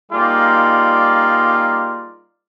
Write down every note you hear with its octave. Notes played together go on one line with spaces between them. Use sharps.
G3 A#3 D#4 F4 G#4 D5